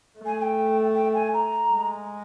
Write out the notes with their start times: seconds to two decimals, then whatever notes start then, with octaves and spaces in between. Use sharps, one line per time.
0.18 A3
0.26 G#5
0.38 G#5
0.42 G5
0.95 G5
1.15 G#5
1.34 A#5
1.72 G#3